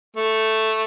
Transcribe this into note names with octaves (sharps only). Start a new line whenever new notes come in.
A3